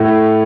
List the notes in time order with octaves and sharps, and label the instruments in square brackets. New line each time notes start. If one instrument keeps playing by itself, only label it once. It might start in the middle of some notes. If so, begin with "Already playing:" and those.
Already playing: [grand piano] A2